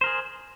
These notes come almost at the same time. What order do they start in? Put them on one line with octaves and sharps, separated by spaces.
C5 A#4 G#4